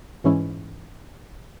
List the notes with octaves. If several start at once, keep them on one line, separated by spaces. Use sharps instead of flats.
G#2 E3 G#3 C#4 E4